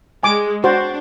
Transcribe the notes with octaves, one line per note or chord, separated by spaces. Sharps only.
G#3 G#5 D6
D4 F#4 C5